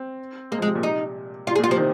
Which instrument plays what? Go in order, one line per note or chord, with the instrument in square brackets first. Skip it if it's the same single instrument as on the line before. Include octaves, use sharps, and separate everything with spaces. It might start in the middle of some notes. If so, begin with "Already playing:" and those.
Already playing: [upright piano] C4
[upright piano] G#3 [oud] A#3
[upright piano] F3
[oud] G#3
[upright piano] C3
A#2
[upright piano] C3 [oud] D#4
[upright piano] C3 [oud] F4
[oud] G#4
[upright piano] A#2
[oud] F4
[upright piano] C3 [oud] F3
[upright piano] D#3